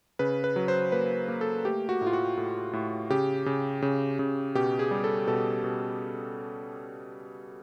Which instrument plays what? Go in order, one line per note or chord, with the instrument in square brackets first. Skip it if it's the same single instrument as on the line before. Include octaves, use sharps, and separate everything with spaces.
[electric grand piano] C#3 B4
B4
F#3
C5
A#3 B4
A#3
A4
A3 G4
F#4
A2
F4
F#4
A2
A2
C#3 G4
C#3
C#3
C#3
B2 G4
G#4
G3
A4
B2 A4
B2